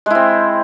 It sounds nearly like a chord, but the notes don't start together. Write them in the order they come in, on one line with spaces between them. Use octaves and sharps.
G#3 E4 C4